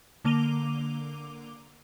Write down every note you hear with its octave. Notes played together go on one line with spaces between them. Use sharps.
D3 A#3 D6 D#7 F7 G7